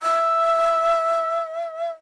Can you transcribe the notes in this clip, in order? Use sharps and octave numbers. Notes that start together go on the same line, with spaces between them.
E5 E6